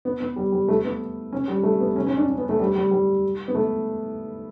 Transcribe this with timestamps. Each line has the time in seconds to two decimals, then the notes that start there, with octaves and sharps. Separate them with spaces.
0.05 B3
0.20 B3
0.36 G3
0.52 G3
0.68 A3
0.85 B3
1.33 C#4
1.48 G3
1.63 A3
1.80 B3
1.96 C#4
2.07 C#4
2.17 D4
2.27 C#4
2.38 B3
2.49 A3
2.60 G3
2.76 G3
2.91 G3
3.48 B3
3.55 A3